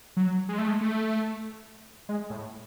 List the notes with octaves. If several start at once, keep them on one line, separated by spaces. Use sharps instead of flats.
F#3
G#3
A3
G#3
A3
G#3
A2